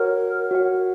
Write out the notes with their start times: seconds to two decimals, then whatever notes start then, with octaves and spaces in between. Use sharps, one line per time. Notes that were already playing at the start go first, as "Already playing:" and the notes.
Already playing: F#4 A#4 C#5 F#5
0.51 F#4 C#5 F#5